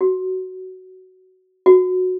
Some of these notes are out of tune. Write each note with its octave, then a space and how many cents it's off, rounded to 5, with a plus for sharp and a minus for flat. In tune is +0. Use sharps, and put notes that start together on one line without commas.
F#4 +15
F#4 -10